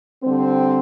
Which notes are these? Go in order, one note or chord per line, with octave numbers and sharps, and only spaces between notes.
D3 G3 C4